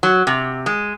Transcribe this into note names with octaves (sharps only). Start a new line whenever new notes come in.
F#3
C3
G#3